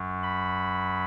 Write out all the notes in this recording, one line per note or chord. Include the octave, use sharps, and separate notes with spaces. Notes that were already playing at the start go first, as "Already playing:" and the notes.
Already playing: F#2 F#3
B5